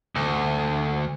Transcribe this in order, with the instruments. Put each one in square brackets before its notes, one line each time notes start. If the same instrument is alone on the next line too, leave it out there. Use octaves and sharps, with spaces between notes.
[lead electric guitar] D2